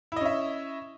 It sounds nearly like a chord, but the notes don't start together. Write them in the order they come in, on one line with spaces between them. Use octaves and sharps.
E4 D#5 C#4 E5